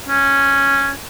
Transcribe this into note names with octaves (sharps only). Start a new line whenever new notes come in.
C#4